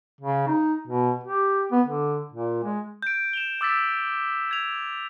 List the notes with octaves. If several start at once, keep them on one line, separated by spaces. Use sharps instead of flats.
C#3
D#4
B2
G4
B3
D3
A#2
G#3
G6 D7
E7 F7 G7
D6 E6 A6 B6
G#6 F7